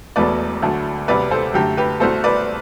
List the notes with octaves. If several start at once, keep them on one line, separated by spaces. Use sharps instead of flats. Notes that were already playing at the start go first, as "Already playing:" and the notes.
E1 E2 B2 A3 B4 D5
D2 D3 F#3 A3
E1 D2 C3 G3 B4 D5
A4 C5
F#2 D3 A3 G4
G4 B4
C2 B2 A3 A4 C5
B4 D5